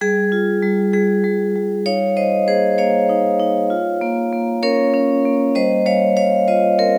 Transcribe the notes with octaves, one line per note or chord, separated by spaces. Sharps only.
G3 G#4
F4
G3
G3 G#4
G3
G3
D#4 C#5 F5
D#4 C5 D#5
A#3 G#4 C5
A#3 C#5 F5
D#4
D#4
F4
A#3
A#3
C#4 A#4 C#5
C#4
A#3
G3 C5 D#5
G3 C#5 F5
G3 C#5 F5
F4 C5 D#5
C4 A#4 C#5